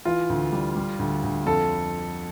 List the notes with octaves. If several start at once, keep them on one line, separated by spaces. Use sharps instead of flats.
E3 F4
D2
G3
G3
D2
D2
F2 A4